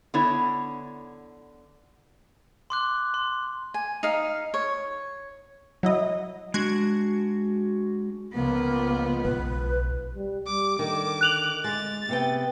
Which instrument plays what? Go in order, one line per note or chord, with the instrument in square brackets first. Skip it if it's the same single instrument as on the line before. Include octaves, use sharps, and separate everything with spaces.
[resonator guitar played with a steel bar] D3 B3 E4 C#5
[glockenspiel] C6 D6 F#6
C6
[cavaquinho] G#5
D#4 F5
C#5
[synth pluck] F#3 E4 D#5
[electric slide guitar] G#3 D4 F#4 [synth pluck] F#6 G#6
[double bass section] C#2 F3 [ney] A#3 [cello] B3
[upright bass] B1 [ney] B4
[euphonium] G3
[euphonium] G3 [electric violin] D6
[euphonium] D3 [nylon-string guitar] D#3 [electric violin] D6
[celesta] F#6 F7 F#7
[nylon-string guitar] G#3 [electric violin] A6
[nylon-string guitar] C3 B3 G5